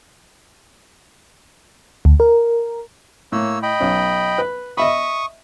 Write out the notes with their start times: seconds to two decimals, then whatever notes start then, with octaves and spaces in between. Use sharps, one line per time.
2.05 D2
2.20 A#4
3.32 A2 A#3 C#5 E6
3.63 D#5 G5 B5
3.80 B1 C#4
4.38 B4
4.77 D#5 E5 B5 C#6 D#6